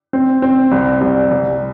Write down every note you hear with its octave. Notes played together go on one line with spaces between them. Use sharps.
C4
C4
C2
C2
C2